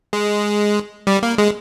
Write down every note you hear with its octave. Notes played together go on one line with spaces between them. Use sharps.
G#3
G3
A#3
G#3